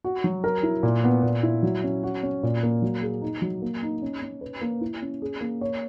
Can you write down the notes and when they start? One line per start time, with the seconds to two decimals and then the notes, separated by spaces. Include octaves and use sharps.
0.04 F#4
0.24 F#3
0.44 A#4
0.63 E4
0.83 A#2
1.04 B3
1.23 A#2
1.43 E4
1.63 F#3
1.84 C#4
2.03 F#4
2.23 C#4
2.43 A#2
2.63 A#3
2.82 F#3
3.02 G#4
3.22 D#4
3.42 F#3
3.62 A#3
3.83 D#4
4.02 C#4
4.22 C#4
4.41 B4
4.61 A#3
4.81 E4
5.02 C#4
5.22 G#4
5.41 A#3
5.61 C#5